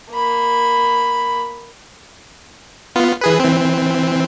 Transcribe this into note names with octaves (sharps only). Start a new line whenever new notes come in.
A#3 B5
B3 F4
E3 G#4 B4
E3 C4